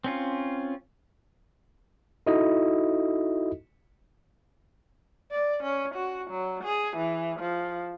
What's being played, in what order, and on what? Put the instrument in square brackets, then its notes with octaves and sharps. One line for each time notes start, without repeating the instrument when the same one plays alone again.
[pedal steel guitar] C4 C#4 F4
[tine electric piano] D#4 E4 F#4 A4 D#5 E5
[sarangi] D5
C#4
F#4
F#3
G#4
E3
F3